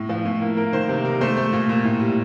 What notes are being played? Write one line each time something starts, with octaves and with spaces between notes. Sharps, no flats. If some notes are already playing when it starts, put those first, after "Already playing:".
Already playing: A2
F3
A2
A#3
A#3 A#4
D#3 C5
C3
G3 A#4
A3 C5
A3
A#2
A#2
A2
G3